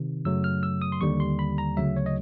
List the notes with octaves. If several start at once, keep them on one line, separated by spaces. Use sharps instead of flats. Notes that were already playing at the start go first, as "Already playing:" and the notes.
Already playing: C3 D#3
F#2 C#3 F#3 A3 E6
F6
E6
D#6
C6
D#2 D3 G3 C#6
C6
B5
A#5
D2 C#3 F#3 E5
C#5
D#5